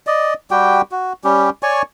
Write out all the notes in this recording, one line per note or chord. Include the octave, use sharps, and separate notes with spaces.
D5 D#5
G3 F#4 G4 G5
F#4
G3 C#4 G4
C#5 D5 G#5 C#6